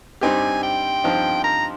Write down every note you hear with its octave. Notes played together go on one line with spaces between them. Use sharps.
G2 G3 C4 D#4 G4 G#5
G5
G2 F3 C4 D#4
A#5